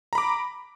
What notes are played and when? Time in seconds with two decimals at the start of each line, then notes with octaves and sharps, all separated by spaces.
0.13 A#5
0.15 B5
0.18 D6